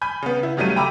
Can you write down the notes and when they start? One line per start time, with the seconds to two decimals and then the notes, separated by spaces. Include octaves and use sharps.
0.02 G#5 B5 G6
0.22 C#3 B3
0.43 E4
0.57 G1 C#3 F#3 G3 A3 D#7
0.76 G5 A#5 B5 D6 E6